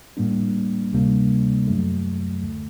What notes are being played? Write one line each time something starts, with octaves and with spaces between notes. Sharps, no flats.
A2 G3 A#3 D4
D2 C3 G3 A#3 D4
F#2 F#3 A3
D2 D3 A3